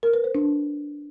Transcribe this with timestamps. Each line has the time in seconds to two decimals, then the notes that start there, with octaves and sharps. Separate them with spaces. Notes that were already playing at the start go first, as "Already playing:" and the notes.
0.03 A#4
0.14 B4
0.24 C5
0.35 D4